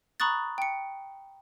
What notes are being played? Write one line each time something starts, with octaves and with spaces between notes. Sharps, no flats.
A#5 B5 C#6 D#6 F#6 A6
G5 C#7